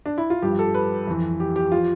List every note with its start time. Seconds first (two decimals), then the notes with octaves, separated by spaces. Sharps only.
0.06 D4
0.18 E4
0.30 F4
0.42 G2 F3 G4
0.59 A4
0.74 B4
1.07 F2 E3
1.40 G4
1.56 G4
1.72 F3 F4